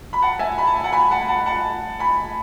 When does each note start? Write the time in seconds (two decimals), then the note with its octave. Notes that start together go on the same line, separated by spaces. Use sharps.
0.13 B5
0.22 F#5 A5
0.39 E5 G#5
0.58 B5
0.67 A5
0.76 G#5
0.84 F#5 A5
0.93 G#5 B5
1.11 F#5 A5
1.28 F#5 A5
1.46 F#5 A5
1.99 G#5 B5